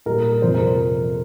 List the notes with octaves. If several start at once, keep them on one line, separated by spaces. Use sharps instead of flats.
A#2 G3 A#4
F2 C3 F3 C5
A#4